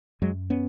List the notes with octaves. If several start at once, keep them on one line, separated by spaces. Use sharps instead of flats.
F#2 F#3 G#3
B3 C#4